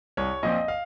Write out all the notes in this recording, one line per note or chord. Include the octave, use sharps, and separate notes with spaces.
C2 C#5
A#2 F3 C4 D#5
F5